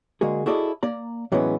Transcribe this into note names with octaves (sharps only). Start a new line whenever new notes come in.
D3 G#3 A#3 F#4 G#4
E4 F#4 G#4 A4 D5 D#5
A#3 D5 A#5
A2 E3 F#3 G#3 B3 C#4